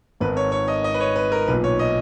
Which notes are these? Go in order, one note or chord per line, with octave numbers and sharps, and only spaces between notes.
G#1 G#2 D#3 B4
C#5
C#5
D#5
D#5
B4
C#5
B4
A#4
B1 A#2 B4
C#5
D#5